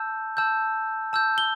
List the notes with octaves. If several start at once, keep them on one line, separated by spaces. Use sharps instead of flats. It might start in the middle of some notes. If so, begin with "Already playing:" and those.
Already playing: A5 E6 G6
A5 E6 G6
A5 E6 G6
G7